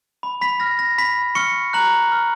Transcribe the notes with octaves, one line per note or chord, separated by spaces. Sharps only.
B5
B5 B6
F6 A#6
A#6
B5 B6
C#6 F6 C#7
A#5 F#6 F#7
F6